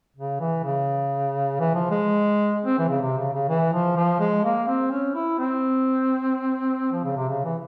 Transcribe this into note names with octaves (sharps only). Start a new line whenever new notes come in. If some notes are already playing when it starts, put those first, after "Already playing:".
C#3
E3
C#3
E3
F3
G#3
C4
E3
C#3
C3
C#3
C#3
E3
F3
F3
G#3
A#3
C4
C#4
E4
C4
F3
C#3
C3
C#3
E3